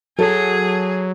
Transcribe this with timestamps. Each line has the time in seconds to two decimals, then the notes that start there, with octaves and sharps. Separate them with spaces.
0.19 F#3 G#4 A4